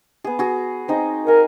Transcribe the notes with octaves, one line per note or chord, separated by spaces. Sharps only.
B3 G#4
F#4 G#4
C4 D#4 G#4
A#4 F#5 G#5